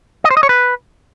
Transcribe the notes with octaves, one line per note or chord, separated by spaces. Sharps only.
D#5
C5
D#5
C#5
B4